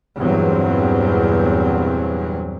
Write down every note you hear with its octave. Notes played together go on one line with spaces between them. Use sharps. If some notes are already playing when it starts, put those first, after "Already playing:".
E2 G2 A#2 F#3 C4